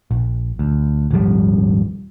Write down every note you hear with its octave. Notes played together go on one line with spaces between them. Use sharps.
A#1
D2
D#1 G#1 F3 G3